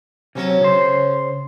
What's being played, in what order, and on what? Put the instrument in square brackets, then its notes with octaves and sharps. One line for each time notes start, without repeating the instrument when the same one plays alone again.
[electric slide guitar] C3 F#3 [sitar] C#4 A4 C#5
[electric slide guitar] C#3 C5